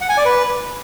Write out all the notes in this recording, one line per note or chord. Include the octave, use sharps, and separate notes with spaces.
F#5
G#5
D5
B4